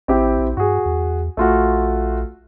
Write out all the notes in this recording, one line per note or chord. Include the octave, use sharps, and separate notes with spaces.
A1 C4 E4 G4
A#1
G2 F#4 G#4
E2
A#1 A3 F4 F#4